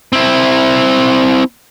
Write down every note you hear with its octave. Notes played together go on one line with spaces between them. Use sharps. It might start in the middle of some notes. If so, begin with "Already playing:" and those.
C4 E4